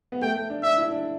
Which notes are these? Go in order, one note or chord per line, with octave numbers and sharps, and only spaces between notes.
B3
A3 G5
A3
D4
D4 E5
E4
D4